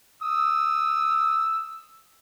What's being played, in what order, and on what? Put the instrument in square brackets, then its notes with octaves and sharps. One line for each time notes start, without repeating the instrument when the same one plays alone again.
[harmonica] D#6 E6